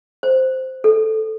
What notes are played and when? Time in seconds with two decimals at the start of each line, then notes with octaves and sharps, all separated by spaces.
0.23 C5
0.84 A4